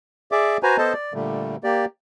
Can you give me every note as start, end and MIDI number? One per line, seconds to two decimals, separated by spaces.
0.32 0.57 68
0.32 0.57 74
0.32 0.57 76
0.32 0.57 86
0.63 0.77 66
0.63 0.77 71
0.63 0.77 72
0.63 0.77 80
0.63 0.77 82
0.78 0.93 59
0.78 0.93 69
0.78 0.93 72
0.78 0.93 75
0.78 0.93 81
0.93 1.13 74
1.14 1.56 46
1.14 1.56 50
1.14 1.56 55
1.14 1.56 57
1.64 1.85 58
1.64 1.85 67
1.64 1.85 74